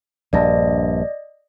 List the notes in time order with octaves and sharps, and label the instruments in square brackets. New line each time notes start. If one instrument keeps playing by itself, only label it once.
[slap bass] A#1 G2 [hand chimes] D5 D#5 A#6